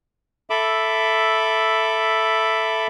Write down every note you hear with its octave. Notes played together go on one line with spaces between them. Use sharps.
A4 E5 B5 D6